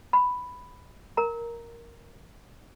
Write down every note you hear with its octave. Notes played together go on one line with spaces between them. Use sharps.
B5
A#4 A#5